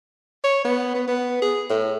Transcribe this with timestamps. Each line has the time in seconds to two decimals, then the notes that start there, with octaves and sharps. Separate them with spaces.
0.44 C#5
0.65 B3
0.95 B3
1.08 B3
1.42 G#4
1.70 A2